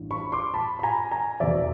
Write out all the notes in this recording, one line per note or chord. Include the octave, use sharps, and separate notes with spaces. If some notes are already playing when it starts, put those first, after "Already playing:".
Already playing: A1 G2 E3
B5 C#6
C6 D6
A5 B5
B5
G#5 A#5
G#5 A#5
F1 E2 B2 D5 E5